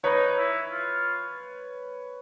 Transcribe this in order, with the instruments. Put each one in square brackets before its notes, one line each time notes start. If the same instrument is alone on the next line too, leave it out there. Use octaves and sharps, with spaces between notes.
[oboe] D#4 [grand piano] B4 C#5
[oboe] E4
F4